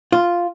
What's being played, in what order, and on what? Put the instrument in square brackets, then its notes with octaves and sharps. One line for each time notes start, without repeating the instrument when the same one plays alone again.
[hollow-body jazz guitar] F4